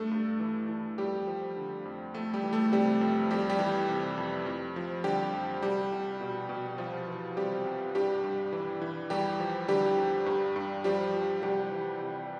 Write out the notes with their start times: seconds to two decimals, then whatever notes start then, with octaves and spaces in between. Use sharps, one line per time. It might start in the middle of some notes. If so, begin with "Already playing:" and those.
Already playing: G2 A3 A4
0.11 G2
0.40 E3
0.69 E3
0.98 F2 G3 G4
1.27 F3
1.56 D3
1.85 F2
2.14 F2 A3 A4
2.34 G3 G4
2.43 E3
2.53 A3 A4
2.72 C3 G3 G4
3.01 F2
3.30 F2 G3 G4
3.50 G3 G4
3.59 E3
3.89 C3
4.17 F2
4.46 F2
4.76 F3
5.04 D3 G3 G4
5.34 F2
5.62 C2 G3 G4
5.92 C2
6.21 B2
6.49 B2
6.78 C2 F3 F4
7.08 E3
7.36 C3 G3 G4
7.66 C2
7.95 G2 G3 G4
8.24 G2
8.53 E3
8.82 E3
9.10 E2 G3 G4
9.40 F3
9.68 D3 G3 G4
9.98 E2
10.26 G2
10.56 G2
10.84 F3 G3 G4
11.14 F3
11.43 C2 G3 G4
11.72 E3
12.01 C3